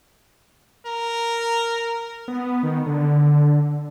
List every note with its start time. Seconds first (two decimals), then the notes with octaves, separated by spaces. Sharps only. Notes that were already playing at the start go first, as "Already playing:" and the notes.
0.86 A#4
2.28 B3
2.63 D#3
2.86 D3